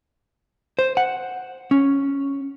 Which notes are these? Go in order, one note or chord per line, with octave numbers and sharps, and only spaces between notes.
C5
F#5
C#4